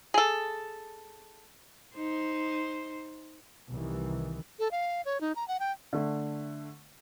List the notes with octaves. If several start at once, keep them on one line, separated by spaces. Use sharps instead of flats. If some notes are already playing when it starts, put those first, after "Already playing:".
G#4 A4
D#4 C5
C2 D#3 E3
A4
F5
C#5
D#4
A#5
F#5
G5
D3 A3